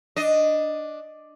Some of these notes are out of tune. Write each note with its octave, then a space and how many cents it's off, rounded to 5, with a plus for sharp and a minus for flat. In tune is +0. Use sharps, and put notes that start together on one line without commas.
D4 +5 D#5 +0